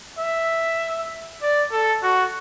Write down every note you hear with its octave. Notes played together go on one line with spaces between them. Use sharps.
E5
D5
A4
F#4